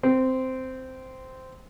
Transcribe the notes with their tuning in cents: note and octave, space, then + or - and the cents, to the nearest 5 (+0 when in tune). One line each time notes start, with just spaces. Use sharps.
C4 -10